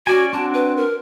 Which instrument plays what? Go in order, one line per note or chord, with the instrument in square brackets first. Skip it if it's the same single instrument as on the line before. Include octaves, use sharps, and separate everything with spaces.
[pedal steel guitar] C#4 D5 G#5 [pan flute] F#4
[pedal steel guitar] C4 D4 F#4 [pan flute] A5
[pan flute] B4
A#4